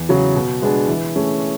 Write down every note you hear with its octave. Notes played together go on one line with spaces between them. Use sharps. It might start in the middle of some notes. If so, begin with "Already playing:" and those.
Already playing: E2
C#3 F#3
B2
G#3 B3 D4 G#4
E3
A3 C#4 G#4